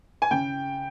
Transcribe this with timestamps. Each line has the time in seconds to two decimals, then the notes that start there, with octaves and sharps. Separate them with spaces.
0.22 G#5
0.31 C#3 G5